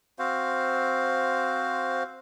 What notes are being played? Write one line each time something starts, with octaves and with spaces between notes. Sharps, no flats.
C4 F#4 C5 F5